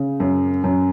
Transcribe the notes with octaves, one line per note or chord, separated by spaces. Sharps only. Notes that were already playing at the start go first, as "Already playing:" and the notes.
Already playing: C#3
F#2
F#2